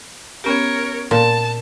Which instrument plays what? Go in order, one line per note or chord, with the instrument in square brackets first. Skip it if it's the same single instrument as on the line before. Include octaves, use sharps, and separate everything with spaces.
[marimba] B3 C#4 G4 [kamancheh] A#4 C#5
[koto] A#2 [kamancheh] A5 [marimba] C6 A6